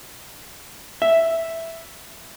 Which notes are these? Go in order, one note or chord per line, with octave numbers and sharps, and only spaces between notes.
E5